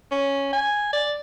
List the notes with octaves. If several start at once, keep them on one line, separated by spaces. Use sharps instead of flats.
C#4
G#5
D5